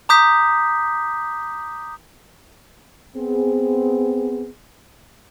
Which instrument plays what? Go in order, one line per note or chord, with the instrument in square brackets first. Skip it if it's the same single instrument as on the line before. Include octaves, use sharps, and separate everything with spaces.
[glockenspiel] A#5 D6 D#6 G6 B6
[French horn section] B3 C4 G#4